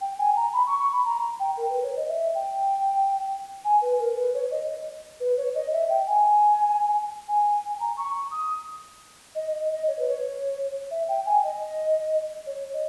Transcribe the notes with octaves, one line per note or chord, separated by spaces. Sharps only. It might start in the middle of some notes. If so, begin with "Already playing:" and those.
G5
G#5
A#5
B5
C#6
C#6
B5
A#5
G5
A#4
B4
C#5
D#5
E5
G5
G#5
B4
A#4
B4
C#5
D#5
B4
C#5
D#5
E5
G5
G#5
G#5
G#5
A#5
C#6
D#6
D#5
D#5
D#5
C#5
B4
C#5
E5
G5
G#5
D#5
C#5
D#5